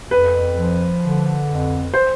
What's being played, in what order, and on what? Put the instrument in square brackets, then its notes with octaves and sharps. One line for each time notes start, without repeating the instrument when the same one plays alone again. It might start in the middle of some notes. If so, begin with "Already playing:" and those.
[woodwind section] F2 [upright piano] B4
[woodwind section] F3
D3
F2
[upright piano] C5